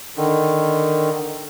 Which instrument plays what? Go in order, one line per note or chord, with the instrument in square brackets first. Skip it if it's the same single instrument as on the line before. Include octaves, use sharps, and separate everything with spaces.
[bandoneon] D3 D#3